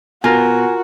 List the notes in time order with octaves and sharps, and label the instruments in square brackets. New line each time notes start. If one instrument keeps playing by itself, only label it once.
[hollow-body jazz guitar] B2 [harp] F4 A#4 [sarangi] F#4 [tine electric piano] G#5